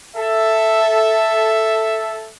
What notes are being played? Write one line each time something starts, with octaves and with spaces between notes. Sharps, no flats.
A4 E5